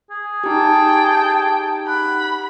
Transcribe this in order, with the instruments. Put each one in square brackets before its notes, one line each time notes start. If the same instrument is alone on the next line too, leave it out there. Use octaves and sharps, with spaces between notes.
[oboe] G#4
[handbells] D#4 G4 [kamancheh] G5 A5
[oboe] F#5 [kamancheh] B5